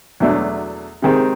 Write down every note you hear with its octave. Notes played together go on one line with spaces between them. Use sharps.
E2 B2 F#3 A3 D4
C3 D#3 G#3 C4